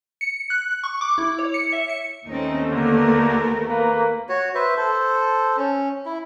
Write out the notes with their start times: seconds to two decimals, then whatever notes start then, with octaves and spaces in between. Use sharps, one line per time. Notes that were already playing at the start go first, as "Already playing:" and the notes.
0.21 C#7
0.50 F#6
0.84 C#6
1.01 D6
1.18 E4
1.39 C#5
1.54 C#7
1.72 E5
1.89 C#7
2.26 D#2 A3 C4 C#4 D#4
2.71 D3 A#3 B3 A#4
3.70 A#3 B4
4.29 F#4 C#5
4.55 B4 C5 E5
4.77 A4 C5
5.57 C#4
6.06 E4